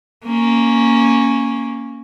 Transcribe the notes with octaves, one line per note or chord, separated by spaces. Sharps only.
A#3 C#4